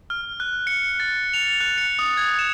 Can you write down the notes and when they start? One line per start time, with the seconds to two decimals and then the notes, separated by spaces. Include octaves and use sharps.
0.10 F6
0.40 F#6
0.67 C#7
1.00 A6
1.34 F7
1.60 F#6
1.78 C#7
1.99 D#6
2.17 G#6
2.39 E7